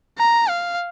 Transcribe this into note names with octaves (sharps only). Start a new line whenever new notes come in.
A#5
F5